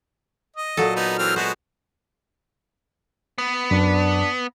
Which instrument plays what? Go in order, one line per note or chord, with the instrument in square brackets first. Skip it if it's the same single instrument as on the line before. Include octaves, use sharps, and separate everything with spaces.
[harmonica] D#5
[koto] A#2 F#3 A4
[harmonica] B3 D#4
E3 C4 F6
[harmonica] G#3 B3 F#4 [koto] C5
[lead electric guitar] B3
[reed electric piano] F#2 [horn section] D4